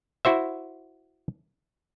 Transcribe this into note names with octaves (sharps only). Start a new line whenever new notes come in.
E4 F#4 C5 E5